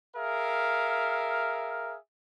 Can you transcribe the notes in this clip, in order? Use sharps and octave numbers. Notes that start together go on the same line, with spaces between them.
G#4 A#4 E5 F5